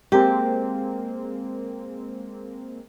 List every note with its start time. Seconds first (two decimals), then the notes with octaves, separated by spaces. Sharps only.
0.12 G#3 A#3 C4 G4